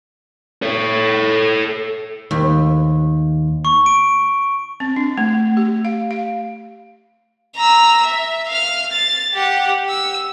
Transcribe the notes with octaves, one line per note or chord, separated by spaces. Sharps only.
A4 C#5
D#2
C#6
D7
C4
D4
A3
G4
F5
F5
A#5 E6
E5
F5 F6
A6
G4 F#5
E6